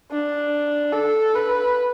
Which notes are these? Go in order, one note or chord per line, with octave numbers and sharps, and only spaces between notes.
D4
A4
B4